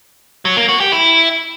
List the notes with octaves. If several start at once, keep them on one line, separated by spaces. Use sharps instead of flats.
F#3
A#3
F#4
G4
E4